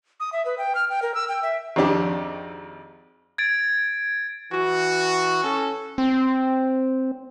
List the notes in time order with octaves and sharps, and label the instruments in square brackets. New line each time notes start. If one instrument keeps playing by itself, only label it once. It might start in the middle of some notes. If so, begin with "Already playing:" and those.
[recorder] D#6
E5
B4
G5
F6
G5
A#4
E6
G5
E5
[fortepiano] G#1 F2 D4 G4
[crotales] G#6 A6 D7
[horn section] E3 F#4
C#4 A4
[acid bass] C4